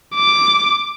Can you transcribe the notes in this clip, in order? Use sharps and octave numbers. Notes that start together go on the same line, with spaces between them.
D6